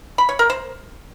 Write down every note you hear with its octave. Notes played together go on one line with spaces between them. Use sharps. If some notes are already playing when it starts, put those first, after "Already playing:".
B5
C#5
A#4
C5